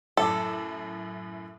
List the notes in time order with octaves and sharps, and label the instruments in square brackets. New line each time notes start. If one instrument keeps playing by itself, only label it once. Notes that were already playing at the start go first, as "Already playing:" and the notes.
[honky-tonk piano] F#2 A2 D6 [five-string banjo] A4